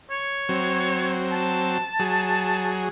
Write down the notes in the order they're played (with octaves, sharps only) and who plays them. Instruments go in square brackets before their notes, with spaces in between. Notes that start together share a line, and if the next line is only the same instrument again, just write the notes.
[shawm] C#5
[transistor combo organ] F#3 C4
[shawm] A5
[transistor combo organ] F#3 G#4